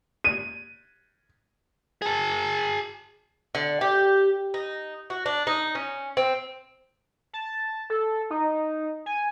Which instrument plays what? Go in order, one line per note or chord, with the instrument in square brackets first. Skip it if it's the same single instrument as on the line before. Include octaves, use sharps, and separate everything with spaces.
[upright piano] D#7
[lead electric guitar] G#4 A5
[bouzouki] D3
G4
D#4
F#4
D4
D#4
C#4
C4
[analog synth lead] A5
A4
D#4
G#5